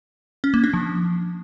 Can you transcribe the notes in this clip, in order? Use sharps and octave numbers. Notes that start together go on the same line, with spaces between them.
C#4
A#3
D4
F3